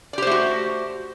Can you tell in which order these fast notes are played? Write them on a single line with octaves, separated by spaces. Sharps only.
D5 G4 C5 A3 F#4